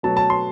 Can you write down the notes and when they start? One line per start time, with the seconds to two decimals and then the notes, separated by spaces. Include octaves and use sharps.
0.03 B2 F#3 A3 A5
0.17 A5
0.30 C6